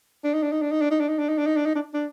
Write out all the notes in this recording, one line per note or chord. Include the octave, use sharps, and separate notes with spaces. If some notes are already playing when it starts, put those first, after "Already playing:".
D4
D#4
D4
D#4
D4
D#4
D4
D#4
D4
D#4
D4
D#4
D4
D#4
D4
D#4
D4
D4